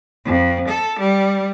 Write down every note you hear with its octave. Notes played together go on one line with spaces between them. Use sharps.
F2
A4
G3